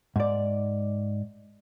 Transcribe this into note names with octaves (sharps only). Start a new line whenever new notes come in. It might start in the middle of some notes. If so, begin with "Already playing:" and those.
G#2 D5